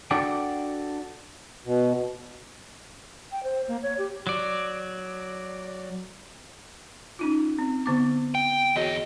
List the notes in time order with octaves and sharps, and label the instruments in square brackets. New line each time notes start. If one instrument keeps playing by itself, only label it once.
[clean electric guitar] D4 F#4 A4 D5 F#5 G5
[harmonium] B2
[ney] G5
C5
A#3
C#5
G4
[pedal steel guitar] F#3 D5
[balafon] C#4 D#4 F4
C4
D3 B3 D6
[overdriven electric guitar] G5
[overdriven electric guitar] E2 D#5 [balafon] F#4 G#4 C#5